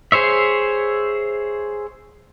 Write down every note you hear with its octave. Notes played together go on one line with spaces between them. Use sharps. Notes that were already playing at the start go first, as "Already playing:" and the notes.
G#4 C5 C#5 E5